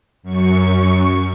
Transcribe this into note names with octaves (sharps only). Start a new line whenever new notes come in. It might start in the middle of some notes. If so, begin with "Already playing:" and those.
F#2 C#6